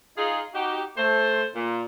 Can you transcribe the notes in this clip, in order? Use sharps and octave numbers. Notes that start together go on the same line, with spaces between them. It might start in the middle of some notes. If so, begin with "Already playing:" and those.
D#4 F4 G#4
D#4 F#4 G4
A3 C5
A#2